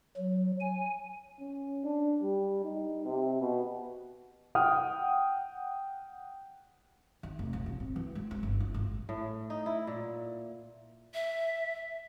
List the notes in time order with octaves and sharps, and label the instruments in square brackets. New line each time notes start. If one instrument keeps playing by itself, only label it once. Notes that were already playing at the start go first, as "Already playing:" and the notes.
[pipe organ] F#3
G#5
[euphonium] C#4
D4
G3
D#4
C3
B2
[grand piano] F#5 G5 D#6 F6
[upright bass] D#3
F1
A#1
A1
C4
E3
G#3
C#4
G1
F4
G#1
[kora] A2
D#4
E4
A#2
[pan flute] E5